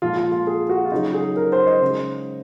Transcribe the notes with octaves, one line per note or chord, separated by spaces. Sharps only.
A#2 F3 G#3 F4
F4
F4
G#4
F#4
F4
C#3 F#3 D#4
G#4
A#4
C5
D#5
C#3 G#3